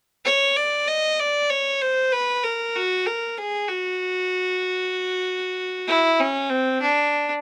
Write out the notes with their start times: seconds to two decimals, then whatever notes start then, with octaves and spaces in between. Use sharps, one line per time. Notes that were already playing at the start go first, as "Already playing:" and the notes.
0.25 C#5
0.56 D5
0.88 D#5
1.20 D5
1.50 C#5
1.81 C5
2.12 B4
2.44 A#4
2.75 F#4
3.06 A#4
3.37 G#4
3.68 F#4
5.88 E4
6.19 C#4
6.50 C4
6.82 D4